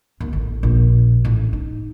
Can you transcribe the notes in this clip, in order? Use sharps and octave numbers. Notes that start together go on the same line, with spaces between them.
D#2
A1
A#1
A1
D#4